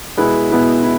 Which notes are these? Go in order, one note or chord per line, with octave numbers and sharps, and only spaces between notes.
B2 G#3 B3 E4
B2 G#3 B3 E4
E4